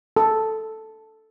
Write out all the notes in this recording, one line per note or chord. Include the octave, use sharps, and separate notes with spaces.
A4